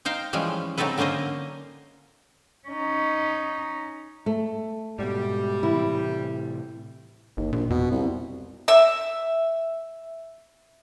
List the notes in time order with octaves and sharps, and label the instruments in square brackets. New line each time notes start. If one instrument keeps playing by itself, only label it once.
[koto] D#4 C5 F5 G5
E3 F3 G3 G#3 C#4
C#3 F#3 C4 D#4 A4 B4
D3 A#3 C#4 C5 D#5
[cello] C#4 D#4
[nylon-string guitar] A3
[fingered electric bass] G#2 B2 [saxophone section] G3
[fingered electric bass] A2 C3 E3 [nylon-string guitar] E4
[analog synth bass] G1 [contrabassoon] D#2
[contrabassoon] A#1 [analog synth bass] A#2
[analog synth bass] F2 [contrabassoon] B2
[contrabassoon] C2
[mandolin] E5 E6